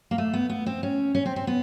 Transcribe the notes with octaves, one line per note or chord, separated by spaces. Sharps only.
A#3
A3
B3
B3
C4
C#4
C#4
C4
C4
B3